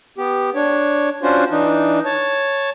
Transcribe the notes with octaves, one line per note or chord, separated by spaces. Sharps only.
B3 G4
D4 C#5
C#4 D4 F4 F#4 C5
E3 D4 D#4
C#5 A5